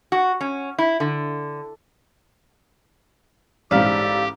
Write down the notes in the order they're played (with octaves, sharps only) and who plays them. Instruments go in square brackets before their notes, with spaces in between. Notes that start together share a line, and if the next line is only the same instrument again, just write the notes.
[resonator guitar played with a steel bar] F#4
C#4
E4
D3
[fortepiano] A1 G#2 [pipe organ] G4 [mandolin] D5 E5 F5